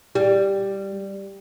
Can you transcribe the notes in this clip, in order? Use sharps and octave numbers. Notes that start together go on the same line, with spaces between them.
G3